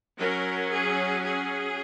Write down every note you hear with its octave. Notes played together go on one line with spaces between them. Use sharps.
F#3 C#4 A#4
G#4
G#4